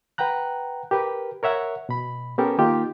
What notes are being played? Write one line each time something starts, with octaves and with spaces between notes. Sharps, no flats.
B4 F#5 G5 A#5 F#6
G4 A#4 B4
A#4 C#5 E5 F#5
B2 B5
B3 C#4 G4 A4 A#4
D#3 A#3 D#4 F4 G4